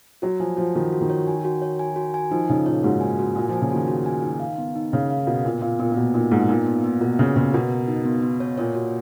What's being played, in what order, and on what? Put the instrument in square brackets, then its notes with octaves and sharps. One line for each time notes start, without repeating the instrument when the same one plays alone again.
[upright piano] F#3 [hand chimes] F#4
[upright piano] F3 [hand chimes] G#5
[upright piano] F3 [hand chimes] F#4
[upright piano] D#3 [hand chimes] F#4
[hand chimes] F#4
[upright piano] D#3
[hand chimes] C#5
G#5
F#4
C#5
G#5
F#4
G#5
[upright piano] F3 [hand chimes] D#4
[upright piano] C#3 [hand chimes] D#4
[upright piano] A#2 [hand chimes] C#5
[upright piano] G#2 [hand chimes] F#4
[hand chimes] G#5
F#4
[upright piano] A#2 [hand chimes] G#5
[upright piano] F3 [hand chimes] G#5
[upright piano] C#3
[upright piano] D#3 [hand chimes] F#4
[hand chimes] F#4
G#5
D#4
F5
B3
D#4
[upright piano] C#3 [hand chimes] F5
[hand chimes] F5
[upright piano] B2 [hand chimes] A#4
[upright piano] A#2 [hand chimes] B3
[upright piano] A#2 [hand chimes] F5
[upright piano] A#2 [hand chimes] B3
[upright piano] A#2
[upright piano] B2 [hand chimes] B3
[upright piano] A#2 [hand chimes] D#4
[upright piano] G#2 [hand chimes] B3
[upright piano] A#2 [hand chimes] D#4
[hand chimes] B3
B3
[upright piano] B2 [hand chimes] A#4
[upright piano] C#3 [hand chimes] C#5
[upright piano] C#3 [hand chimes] B3
[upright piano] B2 [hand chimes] A#4
[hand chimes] A#4
D#4
B3
B3
C#5
[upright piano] A#2 [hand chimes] C#5
[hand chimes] F#4